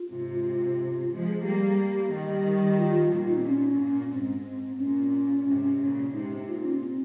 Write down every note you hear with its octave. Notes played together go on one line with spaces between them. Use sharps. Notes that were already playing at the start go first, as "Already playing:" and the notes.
Already playing: F4
G#2 C3
F4
F3 G#3
G#4
G3 A#3 G4
D#3 G3 G4
F4
A#2 F4
D#4
C4
C#4
A#2
G#2 C4
A#2 C#4
G#2 C3
A#2 C#3
G#2 C3 D#4
A#2 F4
C#4
C4